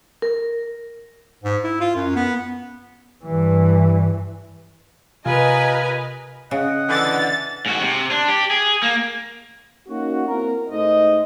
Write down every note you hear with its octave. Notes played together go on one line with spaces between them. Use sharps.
A#4
G#2
E4
F4
F#2
B3
G2 E3
C3 F4 A#4 B4 D#5 G#5
C#3 D#5 F#5
D3 E3 A6
G#2 F#4
C3
D4
G4
G#4
A#3
A#3 C#4 D#4 F#4
A#3 C4 E4 F#4 A#4
G#2 A3 D#4 C5 D#5